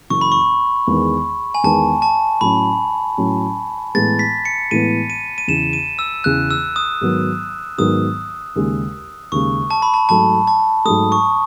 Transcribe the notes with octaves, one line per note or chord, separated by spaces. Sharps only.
F#1 F#2 E3 C#6
B5
C#6
E2 D#3 G#3 B3
G#5
E2 D#3 G#3 B3 A5
A5
A2 F#3 C#4 B5
A2 F#3 C#4
A2 E3 G#3 B3 A6
B6
C#7
A2 E3 G#3 B3 D#7
D#7
D#7
E2 C#3 E3 E7
D#7
E6
E2 C#3 E3 F#6
E6
D#6
G#2 D#3 F#3 B3
G#2 D#3 F#3 B3 D#6
D#2 C#3 G#3
D#2 C#3 G#3 C#6
A5
B5
A5
G#2 F#3 A3 A5
A5
G#2 F#3 A3 D#6
C#6